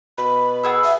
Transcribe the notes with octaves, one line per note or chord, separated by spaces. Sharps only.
B2 B5
B3 G#4 E6
E5